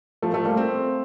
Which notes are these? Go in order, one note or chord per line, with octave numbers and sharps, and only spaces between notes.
F3 A3
F3 A3
G3 A#3
A3 C4